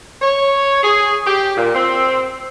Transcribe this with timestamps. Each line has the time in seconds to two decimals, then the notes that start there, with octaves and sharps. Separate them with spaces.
0.22 C#5
0.83 G#4
1.26 G4
1.57 A#2
1.75 C4